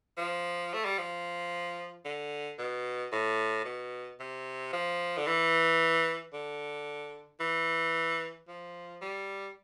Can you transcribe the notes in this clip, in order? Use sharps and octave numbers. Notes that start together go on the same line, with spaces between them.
F3
A3
G3
F3
D3
B2
A2
B2
C3
F3
D3
E3
D3
E3
F3
G3